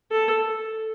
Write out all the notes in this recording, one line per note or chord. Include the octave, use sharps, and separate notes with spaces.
A4